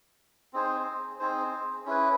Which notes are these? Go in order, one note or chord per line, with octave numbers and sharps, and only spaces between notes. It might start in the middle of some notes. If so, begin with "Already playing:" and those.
C4 D#4 G#4 C5
C4 D#4 G#4 C5
C#4 E4 G#4 B4